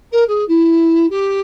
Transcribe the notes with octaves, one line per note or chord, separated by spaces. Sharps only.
A#4
G#4
E4
G4